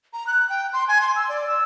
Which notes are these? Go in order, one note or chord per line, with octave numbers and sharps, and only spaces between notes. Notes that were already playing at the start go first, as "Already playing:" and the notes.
A#5
F#6
G5
C6
G#5
C6
E6
D5
E6